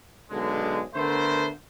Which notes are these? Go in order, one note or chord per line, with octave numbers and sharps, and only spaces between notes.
B1 F#2 D3 G#3
D3 A3 B3 A#4 C5